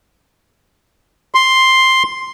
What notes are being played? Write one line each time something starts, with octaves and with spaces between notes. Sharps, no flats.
C6